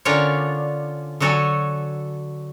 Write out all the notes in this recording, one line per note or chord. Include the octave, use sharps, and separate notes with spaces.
D3 C#4 D4 F4 A#4 C#5
D3 F#3 F#4 A4 C#5 G#5